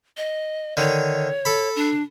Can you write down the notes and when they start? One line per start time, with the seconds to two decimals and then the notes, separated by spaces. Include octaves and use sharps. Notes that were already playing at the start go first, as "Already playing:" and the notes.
0.17 D#5
0.77 D3 D#3 C#5
1.45 A4 B5
1.76 D4